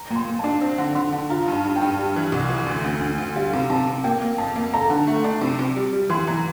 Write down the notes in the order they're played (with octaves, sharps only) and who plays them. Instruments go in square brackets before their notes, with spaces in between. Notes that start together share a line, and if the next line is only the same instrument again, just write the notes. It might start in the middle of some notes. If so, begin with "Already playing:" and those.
Already playing: [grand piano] A#5
[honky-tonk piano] A#2
[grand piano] C6
[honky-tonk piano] A#2
[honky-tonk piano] D4 [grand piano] A5
[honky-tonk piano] C4
D3
[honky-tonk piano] D3 [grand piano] C6
[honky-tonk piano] D3
[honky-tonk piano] F4 [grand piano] A#5
[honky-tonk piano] G2
[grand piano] A5
[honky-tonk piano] G2
[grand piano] G5
[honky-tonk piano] G2
G3
E3
C2
E3
D2
D2
D2
D2
[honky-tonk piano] G3 [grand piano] F5
[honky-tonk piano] C3
[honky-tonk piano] C3 [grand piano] A5
[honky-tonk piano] C3
[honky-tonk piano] A#3 [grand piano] G5
[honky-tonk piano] A#3
[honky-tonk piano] F2 [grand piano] A5
[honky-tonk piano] A#3
[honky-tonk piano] A4 [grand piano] A#5
[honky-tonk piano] D3
A3
D4
C3
C3
G3
G3
[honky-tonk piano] E3 [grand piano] C6
[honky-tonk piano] E3 [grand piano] A#5